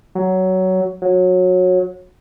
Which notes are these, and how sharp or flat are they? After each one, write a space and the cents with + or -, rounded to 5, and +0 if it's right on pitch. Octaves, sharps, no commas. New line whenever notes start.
F#3 +15
F#3 -20